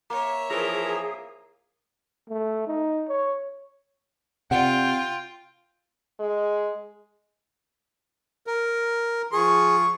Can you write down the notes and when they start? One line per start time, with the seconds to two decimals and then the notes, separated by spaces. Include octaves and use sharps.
0.10 A#3 C#5 E5
0.51 E3 F3 G#4 A#4
2.30 A3
2.67 D#4
3.09 C#5
4.51 C3 F4 D5 F#5 G5
6.19 G#3
8.47 A#4
9.33 F3 G#4 C#6